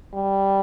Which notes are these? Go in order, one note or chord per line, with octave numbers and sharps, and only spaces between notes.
G3